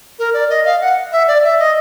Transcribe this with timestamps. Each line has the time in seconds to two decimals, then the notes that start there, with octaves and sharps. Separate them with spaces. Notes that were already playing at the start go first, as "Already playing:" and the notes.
0.19 A#4
0.34 D5
0.50 D#5
0.65 F5
0.81 F#5
1.12 E5
1.28 D5
1.44 E5
1.59 D#5